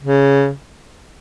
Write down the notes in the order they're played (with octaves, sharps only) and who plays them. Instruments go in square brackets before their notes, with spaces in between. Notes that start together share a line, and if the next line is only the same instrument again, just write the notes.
[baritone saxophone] C#3